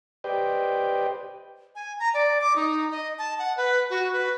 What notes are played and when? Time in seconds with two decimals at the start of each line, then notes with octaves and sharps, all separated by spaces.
0.24 G4 B4 C5 D5 D#5 G5
1.75 G#5
1.99 A#5
2.14 D5
2.41 D6
2.56 D#4
2.92 D#5
3.19 A5
3.39 F#5
3.57 B4
3.90 F#4
4.13 B4